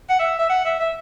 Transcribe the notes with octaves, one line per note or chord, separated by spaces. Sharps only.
F#5
E5
E5
F#5
E5
E5